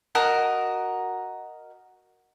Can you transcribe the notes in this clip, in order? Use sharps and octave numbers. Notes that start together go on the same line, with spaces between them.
F#4 A#4 D#5 F#6